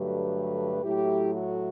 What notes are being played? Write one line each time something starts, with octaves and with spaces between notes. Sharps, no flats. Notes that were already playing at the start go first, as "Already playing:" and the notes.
Already playing: G2 D3 F#3 A3 G4 B4
A2 F#3 A3 E4 G4
F#4